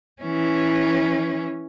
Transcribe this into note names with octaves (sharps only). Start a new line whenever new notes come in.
E3 C#4